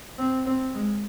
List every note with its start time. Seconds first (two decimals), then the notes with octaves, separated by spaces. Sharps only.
0.18 C4
0.46 C4
0.75 G#3